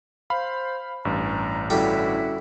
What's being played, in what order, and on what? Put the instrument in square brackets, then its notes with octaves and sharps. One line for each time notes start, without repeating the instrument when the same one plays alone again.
[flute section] C5 [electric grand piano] F5 B5
[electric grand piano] A1 G2 [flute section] A#5
[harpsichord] D3 G3 G4 [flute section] C#4 E4 F#4